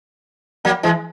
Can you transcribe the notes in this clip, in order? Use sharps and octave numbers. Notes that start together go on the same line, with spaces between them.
F#3 A#3
E3 G#3